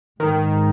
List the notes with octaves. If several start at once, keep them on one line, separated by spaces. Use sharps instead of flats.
G#2 D#3